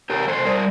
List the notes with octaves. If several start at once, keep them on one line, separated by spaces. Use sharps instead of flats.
C3 G4 A#4
C3 A4 C5
G3 A#4 D5